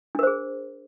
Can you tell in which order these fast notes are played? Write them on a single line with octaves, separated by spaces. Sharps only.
D4 A#4 C5 G#4